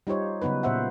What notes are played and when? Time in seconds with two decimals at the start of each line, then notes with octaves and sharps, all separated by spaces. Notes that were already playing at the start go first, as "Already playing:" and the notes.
0.07 G3 D#4 F4 G4 C5 C#5
0.42 C#3 F#3 B3 D#4 B4
0.63 A#2 B3 C5 E5 F#5